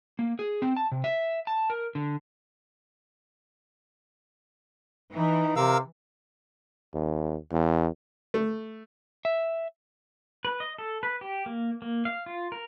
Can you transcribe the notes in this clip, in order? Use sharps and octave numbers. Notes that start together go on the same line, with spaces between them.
A#3
G#4
C4
A5
C3
E5
A5
A#4
D3
E3 D#4
C3 A#4 F5 E6
D#2
E2
A3
E5
B4
D#5
A4
B4
G4
A#3
A#3
F5
F4
A#4